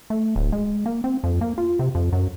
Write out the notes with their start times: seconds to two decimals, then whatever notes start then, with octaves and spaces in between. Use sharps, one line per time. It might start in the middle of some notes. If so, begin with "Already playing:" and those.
0.10 A3
0.36 D1
0.52 G#3
0.86 A#3
1.04 C4
1.24 F2
1.41 A#3
1.58 F4
1.79 C3
1.95 F2
2.12 F#2